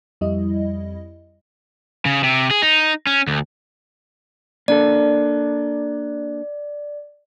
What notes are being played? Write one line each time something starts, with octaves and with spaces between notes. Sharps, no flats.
F2 G3 E4 D#5
C#3
C3
G#4
D#4
C#4
D2
A#3 D4 A4 D5